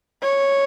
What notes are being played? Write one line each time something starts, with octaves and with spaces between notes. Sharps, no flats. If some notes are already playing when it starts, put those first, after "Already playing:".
C#5